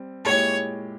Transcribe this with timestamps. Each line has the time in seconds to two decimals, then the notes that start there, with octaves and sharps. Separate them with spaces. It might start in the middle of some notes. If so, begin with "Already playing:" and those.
Already playing: G3 C4
0.25 A#2 G#3 E4 G4 C#5